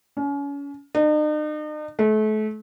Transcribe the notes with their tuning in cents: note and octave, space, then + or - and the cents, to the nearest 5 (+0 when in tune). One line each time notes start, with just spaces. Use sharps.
C#4 +35
D#4 -45
A3 -35